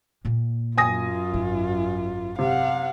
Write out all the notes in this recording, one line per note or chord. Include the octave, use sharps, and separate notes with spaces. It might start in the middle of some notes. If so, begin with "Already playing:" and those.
A#2 A#3
F#2 F4 G#5 D#6 A#6
G#1
C3 F5 F#5